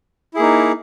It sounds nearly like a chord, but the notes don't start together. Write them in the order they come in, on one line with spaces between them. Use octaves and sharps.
E4 G#4 A#3 D#4